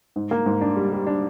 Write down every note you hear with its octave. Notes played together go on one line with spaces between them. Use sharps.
G#2
A#3
G#2
D4
G3
G3
D4